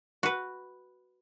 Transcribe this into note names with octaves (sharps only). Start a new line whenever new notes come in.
F#4 B4